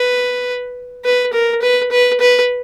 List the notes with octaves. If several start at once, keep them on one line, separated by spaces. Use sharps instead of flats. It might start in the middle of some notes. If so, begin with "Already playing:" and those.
Already playing: B4
B4
A#4
B4
B4
B4